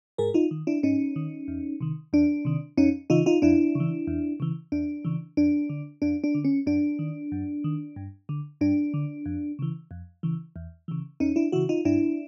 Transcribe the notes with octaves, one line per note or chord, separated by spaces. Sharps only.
G#2 G#4 A#4
D#4 F4
D#3
D4 E4
G#2 C#4 D#4
D#3
E2
C3 D#3
E2 D4
C3 D#3
F2 C#4 D#4
C#3 E3 D#4 F4
D#4 F4
F2 D4 E4
C#3 E3
E2
C#3 E3
E2 D4
C#3 E3
F2 D4
D3
F2 D4
D4
D3
C#4
F#2 D4
D#3
F#2
D#3
G2
D3
G2 D4
D3
F2
C#3 E3
F2
C#3 E3
E2
C#3 E3
E2 C#4 D#4
D4 E4
C#3 E3 E4 F#4
D#4 F4
G2 D4 E4